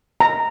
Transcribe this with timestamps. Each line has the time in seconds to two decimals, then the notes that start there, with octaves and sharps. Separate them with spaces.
0.20 A#5